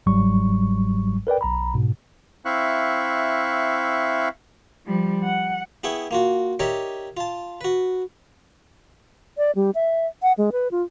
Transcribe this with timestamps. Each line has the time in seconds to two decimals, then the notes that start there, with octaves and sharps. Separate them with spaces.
0.06 G1 G#2 F#3 G3 C#6
1.27 A#4 B4 D5 G5
1.41 B1 A#5 B5
1.74 G#2 B2
2.45 C4 E4 E5 F5 C#6 F#6
4.86 F3 G3
5.23 F#5
5.84 B3 E4 G#4 G5 C#6
6.11 A#3 F4 F#4
6.59 D#4 G4 A#4 C#5 D5 E5
7.17 F4 A5
7.61 F#4 B4
9.38 D5
9.55 G3
9.75 E5
10.22 F#5
10.38 G#3
10.52 B4
10.71 F4